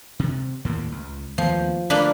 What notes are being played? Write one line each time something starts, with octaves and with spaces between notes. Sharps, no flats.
C3
D#2 A2 A#3
C#2
D#2 F3 A3 B3
D3 A3 A#3 D4 B4